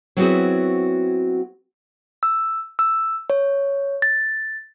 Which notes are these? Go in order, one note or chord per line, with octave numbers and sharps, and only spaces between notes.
F#3 B3 C4 E4 F#4 G#4
E6
E6
C#5
A6